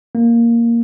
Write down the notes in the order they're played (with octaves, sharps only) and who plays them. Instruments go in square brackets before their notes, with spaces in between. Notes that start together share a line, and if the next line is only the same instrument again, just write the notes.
[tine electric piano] A#3